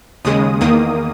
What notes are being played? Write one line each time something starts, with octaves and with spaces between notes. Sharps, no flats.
D#2 C#3 G#3 D#6
E2 D#3 A#3 D#6